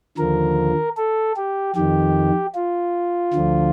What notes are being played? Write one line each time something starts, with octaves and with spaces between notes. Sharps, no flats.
D#2 D3 F3 A#4
A4
G4
F2 D#3 G4
F4
D2 D3 F3